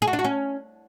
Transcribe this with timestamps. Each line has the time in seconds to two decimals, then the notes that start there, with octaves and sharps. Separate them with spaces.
0.02 G#4
0.07 F#4
0.13 D4
0.19 F#4
0.24 C#4